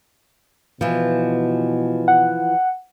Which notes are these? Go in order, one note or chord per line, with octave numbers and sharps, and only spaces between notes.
B2 E3 F3
F#5